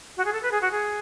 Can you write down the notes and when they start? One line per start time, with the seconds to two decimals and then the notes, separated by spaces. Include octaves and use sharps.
0.17 F#4
0.24 G#4
0.32 A4
0.42 B4
0.51 G#4
0.61 F#4
0.71 G#4